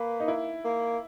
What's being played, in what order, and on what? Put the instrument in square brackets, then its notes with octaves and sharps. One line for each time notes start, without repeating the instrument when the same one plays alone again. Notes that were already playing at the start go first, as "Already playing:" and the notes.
Already playing: [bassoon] A#3 [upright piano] B4
[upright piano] D#4
E4
[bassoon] A#3